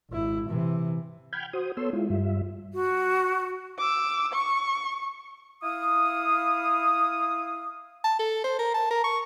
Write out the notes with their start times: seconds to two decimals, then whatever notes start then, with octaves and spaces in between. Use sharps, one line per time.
0.10 G#1 E4
0.47 C3 E3
1.33 F#5 G5 B5 F6 G6 G#6
1.53 F#4 C5 D#6
1.77 B3 A4 C#5 C6 E6
1.93 G#3 E4 F4
2.10 G2 G3 F4 E5
2.74 F#4
3.78 D6 E6
4.33 C#6
5.63 E4 F5 D#6
8.04 A5
8.19 A4
8.44 C5
8.59 A#4
8.74 A5
8.91 A#4
9.04 C#6